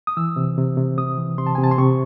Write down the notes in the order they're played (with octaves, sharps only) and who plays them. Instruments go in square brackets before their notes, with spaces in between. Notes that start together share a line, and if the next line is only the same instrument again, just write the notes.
[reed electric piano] D#6
E3 E6
C3
C3
C3
C3 D#6
E3
C3 C6
A5
C3 G#5
A5
C6
C3 C#6